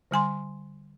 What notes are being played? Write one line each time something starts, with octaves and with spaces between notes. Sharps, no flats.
D3 G3 G#5 C6